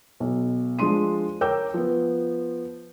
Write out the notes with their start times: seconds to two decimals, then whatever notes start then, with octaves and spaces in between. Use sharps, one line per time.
0.20 B1
0.79 F3 G#3 D4 C6 D#7
1.41 A#4 C#5 G5 D6 E6 G6
1.74 F3 B3